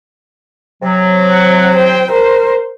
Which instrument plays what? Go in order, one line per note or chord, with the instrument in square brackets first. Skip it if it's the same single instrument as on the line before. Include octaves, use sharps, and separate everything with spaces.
[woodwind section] C3 F#3
[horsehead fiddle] F#5
C5 G5
A#4 C5